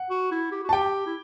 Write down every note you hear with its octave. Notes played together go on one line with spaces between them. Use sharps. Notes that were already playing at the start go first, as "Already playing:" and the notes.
Already playing: F#5
F#4
E4
G4
F#4
A5
G4 G5
E4